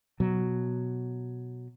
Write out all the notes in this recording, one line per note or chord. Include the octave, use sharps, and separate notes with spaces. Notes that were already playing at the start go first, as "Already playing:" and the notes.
B2 F#3